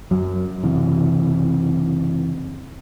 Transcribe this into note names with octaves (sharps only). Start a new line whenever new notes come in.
F#2 F#3
F#1 C3 E3